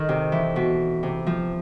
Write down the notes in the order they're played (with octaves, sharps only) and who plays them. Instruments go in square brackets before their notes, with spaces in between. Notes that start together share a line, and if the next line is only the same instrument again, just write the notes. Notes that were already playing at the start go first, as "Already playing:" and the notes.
Already playing: [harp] D#3 A4
C3
E3
B2 B4
C3
F3